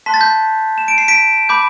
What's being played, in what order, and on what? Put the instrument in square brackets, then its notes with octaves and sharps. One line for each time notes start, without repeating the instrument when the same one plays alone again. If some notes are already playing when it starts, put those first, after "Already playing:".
[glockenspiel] A5 C6 F#6 B6
A6
G6 B6
E7
D7
C7
B6 D7
B5 D6 G6